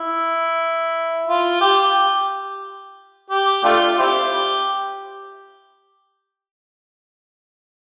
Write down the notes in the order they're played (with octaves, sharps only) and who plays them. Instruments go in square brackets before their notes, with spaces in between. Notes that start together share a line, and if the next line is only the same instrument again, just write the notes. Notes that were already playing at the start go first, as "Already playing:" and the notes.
Already playing: [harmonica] E4
F4
G4
G4
A3 D4 F4
C4 E4 G4